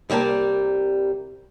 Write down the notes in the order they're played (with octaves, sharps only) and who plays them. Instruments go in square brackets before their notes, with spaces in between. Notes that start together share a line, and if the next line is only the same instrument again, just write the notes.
[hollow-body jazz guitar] C2 G3 A#3 D5 A5